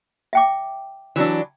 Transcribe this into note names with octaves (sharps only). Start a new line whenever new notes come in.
E5 G5 D6
E3 F#3 D4